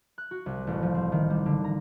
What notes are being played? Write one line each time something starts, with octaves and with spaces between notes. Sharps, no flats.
F#6
F#4
C2
A1
F3
C4
D#3
G3
D3
A#5